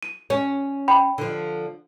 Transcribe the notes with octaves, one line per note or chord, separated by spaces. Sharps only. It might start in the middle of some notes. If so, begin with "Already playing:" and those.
D#7
C#4
G5 B5
D3 F3